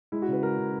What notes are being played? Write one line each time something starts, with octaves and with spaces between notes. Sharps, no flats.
G#3 E4
F#4
C#3
B4
G#3 A#4
C#3